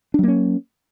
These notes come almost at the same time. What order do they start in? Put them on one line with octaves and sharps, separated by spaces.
D4 F#3 A#3 C#4